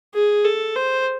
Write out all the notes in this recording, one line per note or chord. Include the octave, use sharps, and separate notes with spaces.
G#4
A4
C5